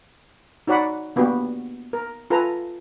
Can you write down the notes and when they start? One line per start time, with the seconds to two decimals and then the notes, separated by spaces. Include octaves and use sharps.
0.67 D#4 F#4 C#5 D5 F#5 B5
1.16 A#3 B3 D4 F#4 G4
1.93 A#4
2.30 F4 A4 B4 G#5 A#5